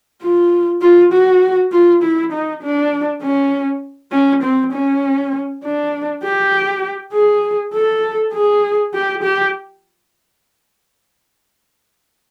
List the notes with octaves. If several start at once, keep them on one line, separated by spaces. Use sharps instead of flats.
F4
F4
F#4
F4
E4
D#4
D4
C#4
C#4
C4
C#4
D4
G4
G#4
A4
G#4
G4
G4